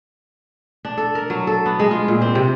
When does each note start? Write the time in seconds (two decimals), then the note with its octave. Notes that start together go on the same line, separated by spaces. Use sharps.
0.85 D4
0.98 A4
1.15 A#4
1.30 F#3
1.47 A4
1.65 B3
1.79 G#3
1.91 F4
2.08 A#2
2.21 C4
2.35 C3